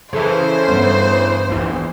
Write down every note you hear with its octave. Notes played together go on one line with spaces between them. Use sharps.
C#3 E3 G#4 A4 C5
G2 B3 C#4
A#1 E2